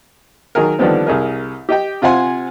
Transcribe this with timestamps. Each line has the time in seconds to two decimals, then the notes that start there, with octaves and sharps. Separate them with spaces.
0.55 D#3 F#3 G#4 A#4
0.79 D3 D#3 F3 G3 B3 C4
1.07 C2 G#4 A#4
1.69 G4 D#5 G5
2.02 C3 F4 C5 F#5 G#5 C6